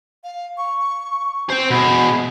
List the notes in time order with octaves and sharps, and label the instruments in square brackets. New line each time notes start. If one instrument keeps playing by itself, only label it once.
[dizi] F5
C#6
[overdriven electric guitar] C5 G5
[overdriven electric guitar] B2 G#4 [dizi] B5